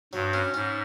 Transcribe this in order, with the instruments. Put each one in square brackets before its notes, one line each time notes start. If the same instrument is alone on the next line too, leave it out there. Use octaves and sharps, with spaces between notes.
[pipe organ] G2 [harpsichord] F#3
[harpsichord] C#4
[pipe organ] G#2 [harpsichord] C#4